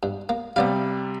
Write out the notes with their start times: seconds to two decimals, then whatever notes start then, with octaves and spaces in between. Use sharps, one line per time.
0.03 G2
0.29 A#3
0.56 C3 G3 B3 D5 F5